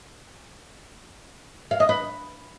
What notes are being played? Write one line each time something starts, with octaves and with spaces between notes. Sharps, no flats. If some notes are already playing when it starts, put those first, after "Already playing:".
F5
D#5
B4